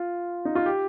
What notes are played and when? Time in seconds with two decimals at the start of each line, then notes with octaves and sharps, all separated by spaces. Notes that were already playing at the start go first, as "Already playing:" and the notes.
Already playing: F4
0.45 D#4
0.55 F4
0.66 G4